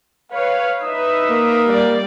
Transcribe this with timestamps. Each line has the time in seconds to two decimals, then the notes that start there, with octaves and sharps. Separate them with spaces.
0.33 B4 C#5 F5
0.82 D#4 B4 E5 D#6
1.30 A#3
1.67 G3 D5